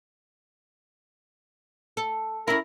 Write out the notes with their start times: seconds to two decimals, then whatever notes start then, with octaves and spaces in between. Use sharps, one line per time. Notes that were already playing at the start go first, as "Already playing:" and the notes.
1.97 A4
2.48 C#4 E4 A#4